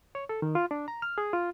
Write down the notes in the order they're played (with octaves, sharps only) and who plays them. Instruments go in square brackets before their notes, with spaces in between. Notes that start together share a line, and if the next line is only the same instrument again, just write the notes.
[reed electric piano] C#5
A4
D#3
F4
D4
A#5
F6
G#4
F4